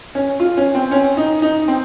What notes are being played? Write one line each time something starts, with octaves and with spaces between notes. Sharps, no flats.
C#4
F4
C#4
C4
C#4
D#4
D#4
C4